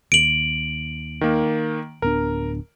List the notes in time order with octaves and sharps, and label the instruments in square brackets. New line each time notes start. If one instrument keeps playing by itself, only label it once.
[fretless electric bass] D#2 [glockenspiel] D7 F#7
[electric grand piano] D#3 A#3
[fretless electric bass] D1 B3 D4 [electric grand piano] A#4